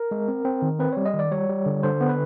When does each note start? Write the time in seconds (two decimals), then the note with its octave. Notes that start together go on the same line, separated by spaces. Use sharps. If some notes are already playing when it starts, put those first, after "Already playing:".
Already playing: A#4
0.11 G#3
0.28 C4
0.45 C4
0.62 D#3
0.79 C4 B4
0.93 G3 C#5
1.05 D#5
1.14 D#3
1.19 D5
1.32 G3 C#5
1.49 G3
1.66 D3
1.83 D3 C5
2.01 B3
2.09 B4